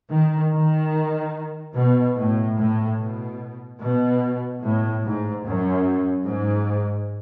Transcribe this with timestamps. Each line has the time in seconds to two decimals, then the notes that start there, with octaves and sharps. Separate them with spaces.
0.10 D#3
0.52 D#3
1.75 B2
2.16 A2
2.57 A2
2.98 B2
3.80 B2
4.62 A2
5.04 G#2
5.44 F#2
6.27 G#2